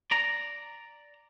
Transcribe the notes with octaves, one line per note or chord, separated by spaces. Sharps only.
D5 A#5